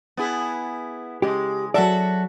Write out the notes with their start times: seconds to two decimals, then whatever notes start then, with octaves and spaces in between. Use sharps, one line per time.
0.17 B3 E4 G#4
1.22 C#3 G#3 G4
1.74 F#3 F#4 A4 D5 E5